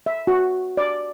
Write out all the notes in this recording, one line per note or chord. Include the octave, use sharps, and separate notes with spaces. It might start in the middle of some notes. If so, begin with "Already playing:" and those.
E5
F#4
D5